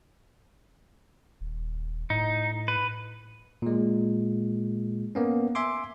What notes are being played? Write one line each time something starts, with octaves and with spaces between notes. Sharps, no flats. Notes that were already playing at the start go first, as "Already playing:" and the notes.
D#1
A2 D#4
B4
A#2 G#3
A#3 B3 C#4
E5 G#5 C6 D6